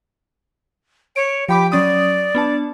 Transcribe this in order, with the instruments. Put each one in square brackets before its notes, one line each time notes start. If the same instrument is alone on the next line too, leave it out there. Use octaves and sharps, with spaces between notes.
[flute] C#5 [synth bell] D7
[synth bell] F3 B5 D6 [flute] G4
[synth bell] F#3 C#4 D#6 [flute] D5
[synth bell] B3 D4 A5